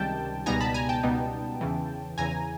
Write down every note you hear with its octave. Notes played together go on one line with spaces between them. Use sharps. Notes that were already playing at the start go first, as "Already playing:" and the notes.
Already playing: C#2 C3 D#3 G3 G5 A5
C#2 B2 G3 B3 D#4 G#5 A#5
A5 B5
G#5 A#5
G5 A5
C#2 B2 G3 B3 D#4
E2 C#3 E3
E2 C#3 E3 G#5 A#5